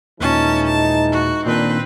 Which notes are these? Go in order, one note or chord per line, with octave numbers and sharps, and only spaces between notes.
D#2 A#2 E3 G#3 C#4 D#4 A5
A5
F#4
A#2 D#3 C4 D4 B4